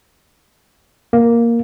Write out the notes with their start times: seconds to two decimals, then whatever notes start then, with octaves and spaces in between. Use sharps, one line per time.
1.13 A#3